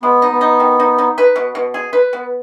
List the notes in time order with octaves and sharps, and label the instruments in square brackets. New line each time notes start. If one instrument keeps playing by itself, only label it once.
[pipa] G#3 [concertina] B3
[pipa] D#4
[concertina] B3
[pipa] D#4
D#3
D#4
D#4
B4
B2
B2
G#4
B4
B3